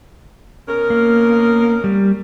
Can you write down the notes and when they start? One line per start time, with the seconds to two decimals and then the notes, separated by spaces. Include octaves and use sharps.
0.69 B2 C#4 A#4
0.90 A#3
1.84 G3